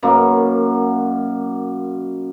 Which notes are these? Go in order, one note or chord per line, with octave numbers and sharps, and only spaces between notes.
F#2 B2 A#3